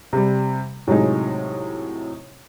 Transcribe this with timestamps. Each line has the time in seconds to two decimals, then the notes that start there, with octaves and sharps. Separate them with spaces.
0.13 C3 G3
0.87 A2 C3 F#3 G#3 D#4